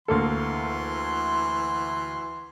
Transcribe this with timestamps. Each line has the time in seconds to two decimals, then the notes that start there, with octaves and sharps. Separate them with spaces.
0.08 D2 E3 A#3 A4 C6